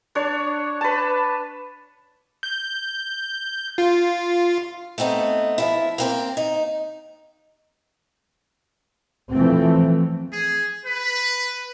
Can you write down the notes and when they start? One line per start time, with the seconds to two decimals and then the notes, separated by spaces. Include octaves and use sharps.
0.15 D4 C#5
0.81 B4 A5
2.43 G6
3.78 F4
4.98 A3 B3 C4 D#4
5.58 F3 E4
5.98 A#3 C4 C5
6.37 D#4
9.32 E3 F3 A3 C4
10.32 G#4
10.86 B4